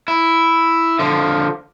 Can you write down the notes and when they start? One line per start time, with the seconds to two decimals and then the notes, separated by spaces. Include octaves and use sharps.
0.08 E4
0.99 D3 F3